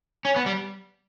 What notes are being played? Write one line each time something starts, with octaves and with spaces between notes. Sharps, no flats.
C#4
B3
G3